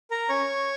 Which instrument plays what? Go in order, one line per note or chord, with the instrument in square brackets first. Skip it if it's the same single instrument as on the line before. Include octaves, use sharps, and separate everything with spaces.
[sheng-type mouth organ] A#4 A#5
C#4 C#5 C#6